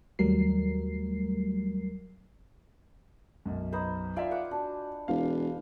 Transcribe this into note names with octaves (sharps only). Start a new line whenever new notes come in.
D#2 F#3 G3 A3 A#4 C7
B1 F#2
D#4 B4 C5
F4 D5 E5 F5 G#5
F#5 D6
D4 F#4
E1 F5